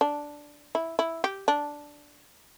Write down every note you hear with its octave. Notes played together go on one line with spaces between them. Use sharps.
D4
E4
E4
G4
D4